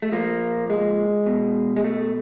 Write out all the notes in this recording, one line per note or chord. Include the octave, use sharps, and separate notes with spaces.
A3
A#2 F3 A#3
G#3
B2
G#3
A3